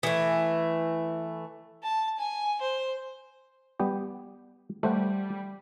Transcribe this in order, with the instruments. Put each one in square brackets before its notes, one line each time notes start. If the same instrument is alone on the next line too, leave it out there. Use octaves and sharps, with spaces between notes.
[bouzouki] E3 A3
[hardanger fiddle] A5
G#5
C5
[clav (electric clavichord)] G3 B3 G4
[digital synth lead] G3 [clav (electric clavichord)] A3 C5 F#5